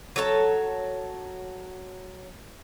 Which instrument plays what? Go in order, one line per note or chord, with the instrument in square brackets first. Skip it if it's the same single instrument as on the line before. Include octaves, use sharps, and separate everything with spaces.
[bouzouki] F#3 A4 C#5 A5